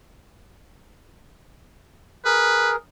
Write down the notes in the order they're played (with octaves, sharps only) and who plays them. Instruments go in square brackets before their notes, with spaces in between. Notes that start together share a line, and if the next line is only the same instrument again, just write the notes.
[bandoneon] G#4 A#4 [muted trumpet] B4